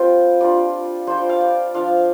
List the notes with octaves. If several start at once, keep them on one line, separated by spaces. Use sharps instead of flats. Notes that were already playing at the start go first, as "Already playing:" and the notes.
Already playing: G3 C4 F4 G5
G3 D4 F4 D5
G3 D4 F4 C5
G5
F5
D5
F3 D4 F4 F5